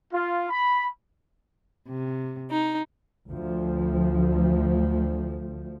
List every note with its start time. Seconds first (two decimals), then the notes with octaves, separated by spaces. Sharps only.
0.13 F4
0.49 B5
1.89 C3
2.51 D#4
3.29 D2 F3